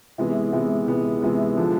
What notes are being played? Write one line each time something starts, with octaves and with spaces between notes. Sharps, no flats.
C3 E3 G#3 B3
C3 E3 G#3 B3
C3 E3 G#3 B3
C3 E3 G#3 B3
D3 F3 G#3